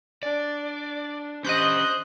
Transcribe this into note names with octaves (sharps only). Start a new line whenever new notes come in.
D4 D5
C#4 G4 C5 D#5 F#6 G6